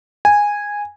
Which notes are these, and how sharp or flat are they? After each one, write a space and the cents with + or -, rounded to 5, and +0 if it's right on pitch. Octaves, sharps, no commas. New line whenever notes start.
G#5 -10